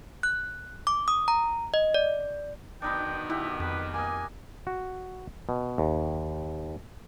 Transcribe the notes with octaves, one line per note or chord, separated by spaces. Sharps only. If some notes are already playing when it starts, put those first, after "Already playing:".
F#6
D6
D#6
A#5
D#5
D5
B2 D#3 D4 D#4 B4 G5
E4 G4 E5 F#5
F2 B4
A#3 D#5 G#5
F#4
B2
D#2